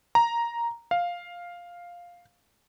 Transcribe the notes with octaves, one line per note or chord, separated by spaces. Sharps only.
A#5
F5